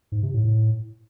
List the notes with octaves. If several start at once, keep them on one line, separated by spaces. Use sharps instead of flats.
G#2
C3
A2
A2